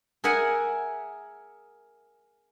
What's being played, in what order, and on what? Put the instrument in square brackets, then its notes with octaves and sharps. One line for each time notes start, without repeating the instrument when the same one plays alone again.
[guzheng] G#4 A#4 E5 F#5 G#5